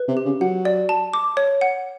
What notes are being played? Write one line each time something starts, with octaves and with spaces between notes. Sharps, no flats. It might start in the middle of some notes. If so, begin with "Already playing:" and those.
Already playing: B4
C3
G4
C#3
F#3 F#5
D5
A5
D6
C#5
F#5